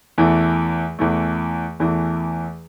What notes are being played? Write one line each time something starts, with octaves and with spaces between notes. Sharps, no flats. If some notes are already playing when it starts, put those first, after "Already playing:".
E2 E3 A3
E2 E3 A3
E2 E3 A3